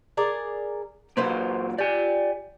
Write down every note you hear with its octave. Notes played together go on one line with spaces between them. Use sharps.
G#4 A#4 D5
A#2 F#3 A#3 B4 C5 F5
G4 D5 G#5